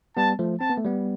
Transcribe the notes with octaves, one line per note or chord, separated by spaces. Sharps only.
G3 B3 A5
F3 A3
C4 A5
B3
A3
G3 B3